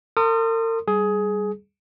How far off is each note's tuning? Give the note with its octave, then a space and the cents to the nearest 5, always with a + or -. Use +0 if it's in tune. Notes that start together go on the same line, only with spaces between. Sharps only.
A#4 -45 C6 +0 D#6 -20
G3 +0 G#4 +15